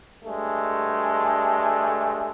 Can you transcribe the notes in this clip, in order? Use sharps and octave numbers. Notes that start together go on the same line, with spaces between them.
G2 G#3 A3